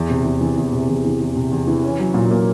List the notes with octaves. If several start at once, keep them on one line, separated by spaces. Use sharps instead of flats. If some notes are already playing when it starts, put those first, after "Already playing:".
Already playing: E2
C3
E2
E3
E2
C3
E2
E3
E2
C3
E2
E3
C#4
F#3
A#2
A#3